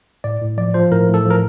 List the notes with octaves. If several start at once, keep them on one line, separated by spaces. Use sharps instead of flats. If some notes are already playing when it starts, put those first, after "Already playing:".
A2 D5
A2
F3 D5
F3 C5
A2 A#4
A2
A4
F3
A#4